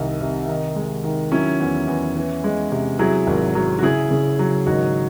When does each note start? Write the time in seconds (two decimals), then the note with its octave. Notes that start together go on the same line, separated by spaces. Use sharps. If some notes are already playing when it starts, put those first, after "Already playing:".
Already playing: C2 D#3 D#4
0.21 C3
0.48 D#3 D#4
0.76 G#3
1.04 D#3
1.32 F#3 C#4 E4
1.60 E2
1.87 E2
2.16 E3
2.44 G#3
2.72 C3
2.99 F#3 E4 G#4
3.27 G#1
3.55 F#3
3.79 F#4
3.83 C#3 E4 G#4
4.11 C#3
4.39 F#3
4.67 G#1 D#4 F#4